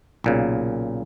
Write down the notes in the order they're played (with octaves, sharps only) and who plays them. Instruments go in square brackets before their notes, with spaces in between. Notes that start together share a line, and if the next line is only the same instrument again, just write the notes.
[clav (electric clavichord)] B1 A#2 C#3